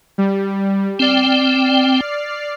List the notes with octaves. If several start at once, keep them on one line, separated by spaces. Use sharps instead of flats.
G3
C4 D5 G5 F6 C7